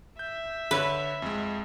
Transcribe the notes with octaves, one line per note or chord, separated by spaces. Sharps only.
E5 G6
D3 B4 C#5
F2 G#3